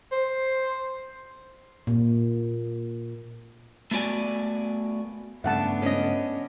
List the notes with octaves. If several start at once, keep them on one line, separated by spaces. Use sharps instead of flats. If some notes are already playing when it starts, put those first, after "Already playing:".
C5
A#2
A3 B3 F#4 D5 G#5
G2 C#3 A3 B3 D4 E5 F#5 A5
C#4 D#5